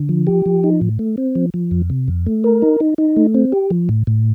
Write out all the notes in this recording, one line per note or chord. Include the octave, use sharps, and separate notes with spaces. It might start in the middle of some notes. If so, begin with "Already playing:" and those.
Already playing: D3
F3
G4
F3
D#4
A2
A3
C4
F3
F3
F2
C3
F2
A3
A#4
D#4
D#4
D#4
A3
C4
G4
F3
A2
A2